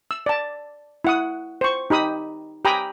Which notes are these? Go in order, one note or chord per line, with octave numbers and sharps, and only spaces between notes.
E6
D5 A5
E4 F#5 D#6
C5 C#6
D#4 G4 B5 D#6
G4 G5 G#5 A#5 B5 D#6